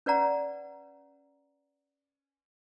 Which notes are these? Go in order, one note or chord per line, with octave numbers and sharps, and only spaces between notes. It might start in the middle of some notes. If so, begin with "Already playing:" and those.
C#4 B4 D5 F#5 A#5